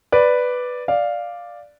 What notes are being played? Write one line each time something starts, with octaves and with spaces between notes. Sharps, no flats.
B4 D5
D5 F5